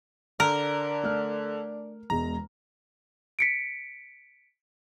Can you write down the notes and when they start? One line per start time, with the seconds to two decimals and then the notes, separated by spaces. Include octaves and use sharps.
0.40 D3 D4 A#4
1.03 A3 F6
2.10 E1 E2 G#3 A#5
3.39 B6 C#7 D7